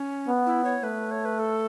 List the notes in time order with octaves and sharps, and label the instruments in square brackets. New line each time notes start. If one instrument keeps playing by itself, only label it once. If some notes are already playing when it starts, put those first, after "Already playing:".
Already playing: [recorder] C#4
[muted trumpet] B3
[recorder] E4
C#5
[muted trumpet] A3 [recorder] B4
[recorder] C#5
B4
A4